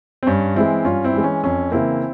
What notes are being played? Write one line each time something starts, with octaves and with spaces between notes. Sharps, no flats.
C4
G2 C#4
E3 G#3 C4 E4
G2 C#4 F4
C4 E4
E3 G#3
C#4
F2 C#4
C#3 E3 A#3 C4 E4